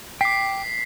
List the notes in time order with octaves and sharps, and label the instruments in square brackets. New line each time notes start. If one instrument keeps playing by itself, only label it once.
[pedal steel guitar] G5 D6 [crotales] B6 C7